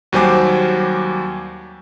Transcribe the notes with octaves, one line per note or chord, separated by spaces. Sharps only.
D#2 F#3 G3 C5 G#5 D6